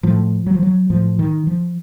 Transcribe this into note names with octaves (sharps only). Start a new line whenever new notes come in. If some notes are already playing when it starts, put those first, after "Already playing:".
A2 F3
F#3
F3
F#3
A2 F3
D#3
F3